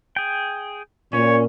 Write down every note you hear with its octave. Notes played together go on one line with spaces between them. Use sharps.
G#4 G5
A#2 C#4 C#5